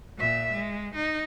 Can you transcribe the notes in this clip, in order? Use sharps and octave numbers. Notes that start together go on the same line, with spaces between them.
A#2 E5
G#3
D#4